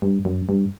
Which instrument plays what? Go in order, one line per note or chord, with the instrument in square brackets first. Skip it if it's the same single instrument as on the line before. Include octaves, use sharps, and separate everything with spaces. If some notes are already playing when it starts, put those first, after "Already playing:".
[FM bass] G2
F#2
G2